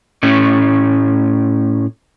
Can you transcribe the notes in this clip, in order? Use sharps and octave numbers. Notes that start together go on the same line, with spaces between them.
A2 A3 C#4